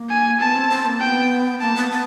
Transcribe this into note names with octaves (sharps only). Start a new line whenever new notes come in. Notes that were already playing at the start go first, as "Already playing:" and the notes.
Already playing: A#3
G#5
B3 A5
C4
C4
A#3
B3 G5
A#3 A5
B3
B3